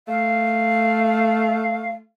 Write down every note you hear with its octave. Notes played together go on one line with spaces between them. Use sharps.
A3 F5